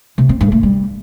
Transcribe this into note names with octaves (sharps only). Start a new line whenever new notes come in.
C3
C4
G2
A3
G3